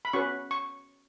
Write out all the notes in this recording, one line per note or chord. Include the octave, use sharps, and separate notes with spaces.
B5
C#4 F#4 B4 C#6
C#6